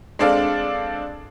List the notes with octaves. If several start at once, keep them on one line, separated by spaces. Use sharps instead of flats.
G#3 C4 D4 A4 F5